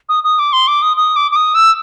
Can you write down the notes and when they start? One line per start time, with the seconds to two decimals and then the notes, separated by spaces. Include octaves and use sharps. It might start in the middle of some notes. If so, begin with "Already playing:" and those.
0.09 D#6
0.24 D#6
0.39 D6
0.53 C6
0.67 D6
0.82 D#6
0.97 D#6
1.16 D6
1.31 D6
1.36 D#6
1.55 E6